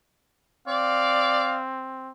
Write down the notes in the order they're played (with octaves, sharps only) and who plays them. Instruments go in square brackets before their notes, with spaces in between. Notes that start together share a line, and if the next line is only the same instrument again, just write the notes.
[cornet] C4 [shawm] D5 [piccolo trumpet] F5